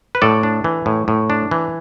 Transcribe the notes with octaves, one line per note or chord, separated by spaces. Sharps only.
B4
A2 A4 D5
D4
E3
A2
A2
D4
E3